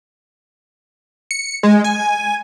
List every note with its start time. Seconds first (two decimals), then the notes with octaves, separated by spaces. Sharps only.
1.31 C#7
1.63 G#3
1.84 G#5